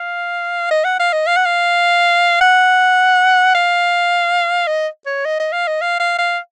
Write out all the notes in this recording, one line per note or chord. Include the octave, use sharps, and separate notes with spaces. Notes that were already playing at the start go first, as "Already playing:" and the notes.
Already playing: F5
D#5
F#5
F5
D#5
F5
F#5
F5
F#5
F5
D#5
C#5
D#5
D#5
F5
D#5
F5
F5
F5